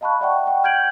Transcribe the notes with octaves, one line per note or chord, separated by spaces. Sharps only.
D#5 F5 A5 B5 C#6 F#6
D5 E5 F#5 G5 A5 C#6
F#5 G5
F6 G6 G#6 D7 F#7